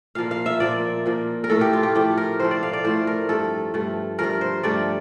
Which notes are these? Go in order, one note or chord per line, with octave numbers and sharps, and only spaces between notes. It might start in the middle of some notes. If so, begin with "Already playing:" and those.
A#2 F3 A#3 F5
F5
E5
A#2 F3 A#3 D5
A#2 F3 A#3
A#4
A2 F3 A3 A4
G4
F4
G4
A2 F3 A3 G4
A#4
A2 F3 A3 C5
D5
F5
D5
A2 F3 A3 C5
A#4
G2 F3 A3 A4
G2 F3 A3
G2 F3 A3 A#4
C5
G2 F3 A3 D5